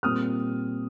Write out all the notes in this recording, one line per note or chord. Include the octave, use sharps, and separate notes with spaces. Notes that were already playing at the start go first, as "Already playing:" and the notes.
A#2 G3 C4 D#6 F6